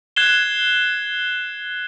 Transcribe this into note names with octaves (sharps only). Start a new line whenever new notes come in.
F#6 G#6 C7 E7 G7